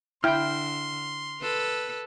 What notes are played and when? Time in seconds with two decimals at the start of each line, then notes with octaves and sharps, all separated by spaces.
0.24 D3 E4 G5 C6 F6
1.41 A4 B4